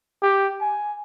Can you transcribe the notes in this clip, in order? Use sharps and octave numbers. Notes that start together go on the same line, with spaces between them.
G4
G#5